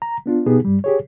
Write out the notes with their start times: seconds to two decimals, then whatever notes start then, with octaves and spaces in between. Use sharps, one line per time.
0.02 A#5
0.26 B3 D4 F4
0.46 B2 B3 D#4 G4 G#4
0.65 G2 G3
0.84 G4 G#4 C#5